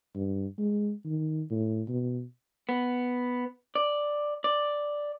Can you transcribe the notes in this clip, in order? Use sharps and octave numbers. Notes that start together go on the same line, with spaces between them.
G2
G#3
D#3
A2
B2
B3
D5
D5